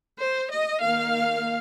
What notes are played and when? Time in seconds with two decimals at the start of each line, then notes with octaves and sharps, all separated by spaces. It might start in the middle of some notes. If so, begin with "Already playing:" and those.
0.18 C5
0.50 D#5
0.81 D#3 A#3 F5